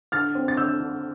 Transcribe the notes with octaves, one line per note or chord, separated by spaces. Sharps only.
D3 F6 A6
C4
A6
D3 E6 G6
D3